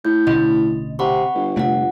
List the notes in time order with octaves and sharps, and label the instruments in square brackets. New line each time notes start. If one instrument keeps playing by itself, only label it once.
[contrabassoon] A2 [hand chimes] G6
[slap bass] A1 B2 D3 [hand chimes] D#5
[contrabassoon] C3 [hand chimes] F#5 B5 C#6
[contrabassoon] G1
[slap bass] F1 A3 [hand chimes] F4 F#5